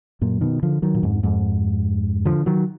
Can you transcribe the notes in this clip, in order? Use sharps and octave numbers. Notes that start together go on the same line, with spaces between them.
F#2 A#2
B2 D#3
D3 F3
D#3 F#3
A#2
F2 G#2
F2 G#2
D3 F3
D#3 F#3